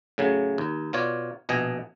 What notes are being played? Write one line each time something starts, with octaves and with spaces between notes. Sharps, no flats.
A2 C#3 F#3
D#2
B2 F4 C#5 D5
A#1 B2 D#5 G#5